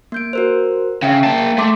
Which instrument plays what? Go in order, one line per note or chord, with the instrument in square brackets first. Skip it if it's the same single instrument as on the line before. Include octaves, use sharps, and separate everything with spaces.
[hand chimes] A#3 G6 D7
F#4 A#4 C5
[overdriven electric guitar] C#3 [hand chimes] E5 G5
[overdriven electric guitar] A#3 A5
[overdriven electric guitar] A3 [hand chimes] E5 C6 D6